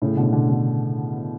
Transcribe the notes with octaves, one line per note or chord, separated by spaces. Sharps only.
A2 C#3
B2 D3
B2 D3
B2 D3